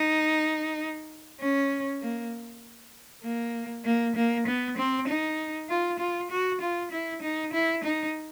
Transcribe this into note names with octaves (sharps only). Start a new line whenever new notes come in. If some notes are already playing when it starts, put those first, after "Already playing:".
Already playing: D#4
C#4
A#3
A#3
A#3
A#3
B3
C4
D#4
F4
F4
F#4
F4
E4
D#4
E4
D#4